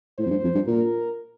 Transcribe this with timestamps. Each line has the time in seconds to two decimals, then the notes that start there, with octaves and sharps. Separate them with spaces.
0.18 A2 C5
0.26 F2
0.30 G2
0.43 F2
0.55 G2
0.67 A#2 A#4